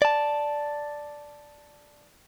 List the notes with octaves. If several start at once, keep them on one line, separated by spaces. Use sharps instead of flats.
D5 A5